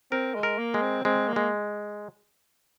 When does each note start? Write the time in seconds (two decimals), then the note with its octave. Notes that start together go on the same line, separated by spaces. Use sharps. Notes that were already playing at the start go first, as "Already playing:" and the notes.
0.12 C4 A#4
0.35 G#3
0.43 A#4
0.58 A#3
0.74 G#3
0.82 C4
1.05 G#3 C4
1.28 A#3
1.36 G#3